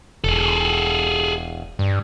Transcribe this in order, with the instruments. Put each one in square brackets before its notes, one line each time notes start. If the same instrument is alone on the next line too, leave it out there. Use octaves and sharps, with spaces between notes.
[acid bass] E1 [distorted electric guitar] G#4 A4
[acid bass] G2